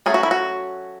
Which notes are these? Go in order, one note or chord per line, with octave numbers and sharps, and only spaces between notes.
F#3 A3 C#4 G#4
F#4
E4
F#4